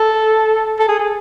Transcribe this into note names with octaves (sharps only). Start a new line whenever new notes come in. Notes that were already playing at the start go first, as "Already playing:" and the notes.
Already playing: A4
A4
G#4
G#4